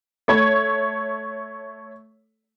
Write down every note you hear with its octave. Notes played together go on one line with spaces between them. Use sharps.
A3 C#5